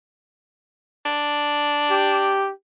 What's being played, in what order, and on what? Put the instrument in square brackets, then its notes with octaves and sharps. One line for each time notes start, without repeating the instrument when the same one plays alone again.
[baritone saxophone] D4
[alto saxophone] G4